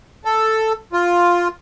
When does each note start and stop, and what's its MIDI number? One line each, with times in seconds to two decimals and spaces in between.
0.25 0.73 69
0.93 1.48 65